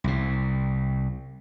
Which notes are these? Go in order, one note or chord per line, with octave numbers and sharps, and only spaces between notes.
C2 C3